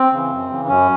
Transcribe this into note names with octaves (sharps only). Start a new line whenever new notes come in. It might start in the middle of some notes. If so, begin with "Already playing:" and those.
Already playing: C4
C#3 E3
F#2
C#3 E3
F#2 C#4